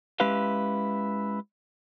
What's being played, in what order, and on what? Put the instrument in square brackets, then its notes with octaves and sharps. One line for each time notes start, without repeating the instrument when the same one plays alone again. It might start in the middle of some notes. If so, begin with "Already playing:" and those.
[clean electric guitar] G#3 C#4 E4 G4 B4 F5